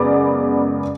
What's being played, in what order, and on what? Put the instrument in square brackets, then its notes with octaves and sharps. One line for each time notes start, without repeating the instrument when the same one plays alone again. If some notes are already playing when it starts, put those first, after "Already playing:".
Already playing: [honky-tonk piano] F#2 C#3 G#3 B3 D5